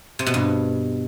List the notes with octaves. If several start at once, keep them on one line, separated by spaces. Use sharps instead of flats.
C3
B2
G2